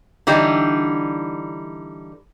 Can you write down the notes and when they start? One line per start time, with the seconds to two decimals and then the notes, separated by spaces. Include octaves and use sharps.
0.27 D3 E3 G3 D#4